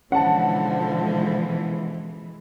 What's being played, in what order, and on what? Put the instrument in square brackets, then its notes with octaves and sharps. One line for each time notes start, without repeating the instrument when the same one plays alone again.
[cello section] B2 E3 G#3 [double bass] D3 F3 [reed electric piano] C#4 [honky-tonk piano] F#5 A5